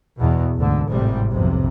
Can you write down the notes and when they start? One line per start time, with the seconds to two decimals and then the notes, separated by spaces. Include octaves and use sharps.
0.19 E2 B2
0.56 D2 G#2 D3
0.88 G#1 A2 C3 G3
1.31 B1 F2 C3